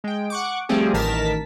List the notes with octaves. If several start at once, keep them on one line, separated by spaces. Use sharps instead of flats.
G#3 G5
F#5 C#6 D6
F3 G3 A3 C4 G4 G#4
A1 D#3 A#4 A5 B6